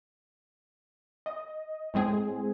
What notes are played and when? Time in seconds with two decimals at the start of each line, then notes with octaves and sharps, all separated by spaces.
1.26 D#5
1.94 A2 G#3 C4 G#4